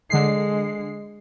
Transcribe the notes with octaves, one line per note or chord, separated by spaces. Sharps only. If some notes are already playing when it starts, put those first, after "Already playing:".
D3 G#3 C7